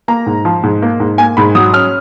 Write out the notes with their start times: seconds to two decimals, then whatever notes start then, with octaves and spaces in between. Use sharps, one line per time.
0.08 A#3 A#5
0.26 G#2
0.45 F3
0.63 G#2
0.82 A#3
1.00 G#2
1.18 A#3 G#5
1.37 G#2 B5
1.55 F#3 D#6
1.73 C#4 F6